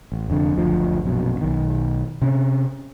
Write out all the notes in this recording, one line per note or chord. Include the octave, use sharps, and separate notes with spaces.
A1
F1 F2 D3
F#1 D2 F3
A#1 F#2 B2
B1 D#3
C3 C#4